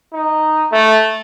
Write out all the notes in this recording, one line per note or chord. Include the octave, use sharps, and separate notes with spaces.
D#4
A3